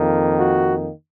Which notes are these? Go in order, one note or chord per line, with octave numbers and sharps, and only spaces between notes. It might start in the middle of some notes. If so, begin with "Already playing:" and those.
Already playing: F2 D#3 A#3
F#4